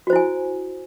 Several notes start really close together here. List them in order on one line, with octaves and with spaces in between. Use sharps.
F#4 C5 E4 G#5